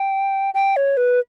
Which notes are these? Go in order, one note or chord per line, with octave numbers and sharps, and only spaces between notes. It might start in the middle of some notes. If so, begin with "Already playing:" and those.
Already playing: G5
G5
C#5
B4